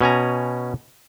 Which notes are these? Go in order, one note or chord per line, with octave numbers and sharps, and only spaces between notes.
B2 C#4 G#5 A#5